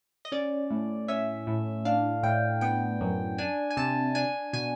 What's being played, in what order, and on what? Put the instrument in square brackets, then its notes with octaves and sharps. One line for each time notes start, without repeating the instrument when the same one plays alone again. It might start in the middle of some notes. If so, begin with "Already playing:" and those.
[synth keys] D#5
C#4 D5
A2
C#4 E5
A2
D4 F5
A2 G5
B3 G5
F#2
D4 G#5
G#5
C3 A5
D4 G#5
B2 G#5